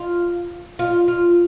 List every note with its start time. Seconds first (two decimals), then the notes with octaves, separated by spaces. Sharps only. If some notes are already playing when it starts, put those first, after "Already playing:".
Already playing: F4
0.79 F4
1.08 F4